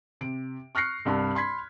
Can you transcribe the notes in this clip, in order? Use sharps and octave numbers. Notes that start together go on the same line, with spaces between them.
C3 D7
C#6 F6 F#6 A#6 C7 C#7
C2 G2 B5
B5 C6 G#6 B6